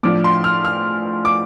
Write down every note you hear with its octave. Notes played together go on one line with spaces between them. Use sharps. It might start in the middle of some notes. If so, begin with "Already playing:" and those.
A2 F3 D4 D6
C6
F6
F6
D6